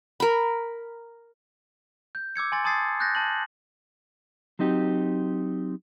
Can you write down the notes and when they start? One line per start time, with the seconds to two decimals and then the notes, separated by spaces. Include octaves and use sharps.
0.20 A#4 B5
2.15 G6
2.36 D6 E6 G#6 C#7
2.52 G#5 C6 A6
2.64 A5 C6 D#6 G#6 A6 C7
3.00 F#6 G6 A6 A#6
3.15 A5 F#7
4.59 F#3 C4 D#4 G4